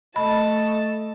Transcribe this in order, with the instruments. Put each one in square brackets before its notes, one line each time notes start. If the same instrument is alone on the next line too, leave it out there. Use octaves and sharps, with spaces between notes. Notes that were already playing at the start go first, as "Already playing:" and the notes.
[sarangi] A3 [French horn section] D#5 [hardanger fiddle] A5 [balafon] B5